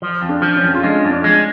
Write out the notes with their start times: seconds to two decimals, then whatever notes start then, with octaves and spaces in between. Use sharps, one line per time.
0.02 F3
0.22 F2
0.29 D4
0.42 F3
0.56 C#4
0.63 F2
0.74 F4
0.83 G#3 D4
1.05 F2
1.11 D4
1.24 G#3